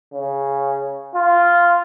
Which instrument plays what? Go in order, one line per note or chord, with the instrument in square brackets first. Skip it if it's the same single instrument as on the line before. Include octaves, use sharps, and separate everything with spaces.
[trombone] C#3
F4